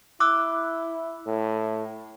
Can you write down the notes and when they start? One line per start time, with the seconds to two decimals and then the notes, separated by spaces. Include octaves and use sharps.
0.20 E4 D6 E6 F#6
1.26 A2